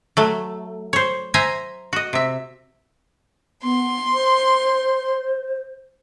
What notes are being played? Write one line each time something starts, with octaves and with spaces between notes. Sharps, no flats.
F#3 A3
C5 C#5
C5 E5 G#5 A#5
F#4 D#5
C3 E5
B3 C6
C5